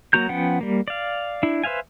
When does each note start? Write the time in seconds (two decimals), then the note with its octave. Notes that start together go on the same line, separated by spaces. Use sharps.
0.13 F#3 A#3 F#4 A#5 G6
0.29 F3 B3 C#4 F#5 G5
0.61 G3 A#3
0.88 D5 F5
1.43 D4 E4
1.64 B4 C5 E5 F5 G#5